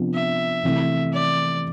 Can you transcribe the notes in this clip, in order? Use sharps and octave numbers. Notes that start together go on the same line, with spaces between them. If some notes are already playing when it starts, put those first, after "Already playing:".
Already playing: C3 F3 B3 D4 F4
E5
C3 E3 A3 E4
D5